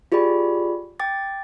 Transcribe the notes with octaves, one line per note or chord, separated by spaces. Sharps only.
F4 G4 G#4 D5 B5
G5 D6 A6